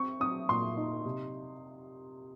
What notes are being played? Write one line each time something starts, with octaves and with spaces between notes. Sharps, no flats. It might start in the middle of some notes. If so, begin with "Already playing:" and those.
Already playing: C4 C#6
C4 D#6
A#2 C6
D#4
C3